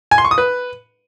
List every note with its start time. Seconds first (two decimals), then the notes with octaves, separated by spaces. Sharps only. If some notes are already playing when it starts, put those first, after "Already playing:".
0.11 G#5
0.18 C6
0.25 C#6
0.31 D#6
0.38 B4